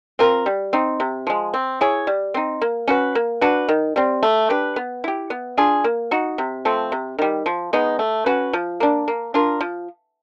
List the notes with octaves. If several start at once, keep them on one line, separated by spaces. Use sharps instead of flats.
C4 F4 A#4
G3
C4 D#4
C3
F3 G#3
C4
E4 G#4 C#5
G3
C4 D#4
A#3
C#4 F#4 B4
A#3
D4 F#4 B4
D#3
G3 C4
A3
D4 G4 B4
B3
E4 G4
B3
D4 F4 G#4
A#3
D#4 F#4
C3
F3 A3 C4
C3
D#3 G3
F3
G#3 B3 D#4
A3
C#4 F#4 B4
F3
A#3 D4
A#3
D4 F4 A#4
F3